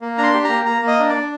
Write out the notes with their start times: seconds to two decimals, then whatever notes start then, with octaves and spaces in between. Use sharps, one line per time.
0.01 A#3
0.18 D4 A#5
0.23 C6
0.34 G4
0.44 A#5
0.49 A#3
0.66 A#3 A#5
0.82 A#3
0.87 D#5
0.99 D4
1.09 D5
1.15 D4